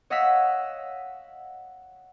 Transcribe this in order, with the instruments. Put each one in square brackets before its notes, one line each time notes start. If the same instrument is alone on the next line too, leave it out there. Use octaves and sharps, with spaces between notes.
[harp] C#5 D#5 F5 F#5 E6 B6